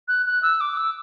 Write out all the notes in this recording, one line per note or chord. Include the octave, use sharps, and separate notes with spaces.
F#6
F#6
E6
D6
E6